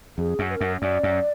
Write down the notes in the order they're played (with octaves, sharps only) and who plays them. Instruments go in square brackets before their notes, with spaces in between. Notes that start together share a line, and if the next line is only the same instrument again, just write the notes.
[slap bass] F2 [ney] G#4
[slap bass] F#2
[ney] B4
A#4
[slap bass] F#2
[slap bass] F#2 [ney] D5
[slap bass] F#2